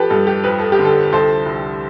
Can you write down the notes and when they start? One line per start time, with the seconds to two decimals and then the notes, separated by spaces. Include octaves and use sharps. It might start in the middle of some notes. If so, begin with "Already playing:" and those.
Already playing: F3 G4 A4 B4
0.10 G2 A4
0.27 G4
0.44 F2 B4
0.58 A4
0.72 G4
0.79 D3
0.85 A4
1.13 C2 A4 C5
1.46 C2